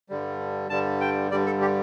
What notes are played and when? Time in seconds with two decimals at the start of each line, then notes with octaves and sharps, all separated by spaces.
0.09 G2 D3 G3
0.70 G2 D3 G3 A5
1.01 G5
1.31 G2 D3 G3 D5
1.46 A4
1.61 G4